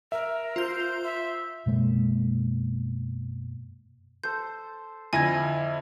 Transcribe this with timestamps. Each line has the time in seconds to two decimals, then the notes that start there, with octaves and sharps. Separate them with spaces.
0.12 A#4 E5
0.56 F4 C5 G6
1.04 E5 C6
1.66 F#2 B2 G#3 A#3
4.24 A4 C5 G6
5.13 F2 D3 F3 E4 E5 G#5 G#6 A#6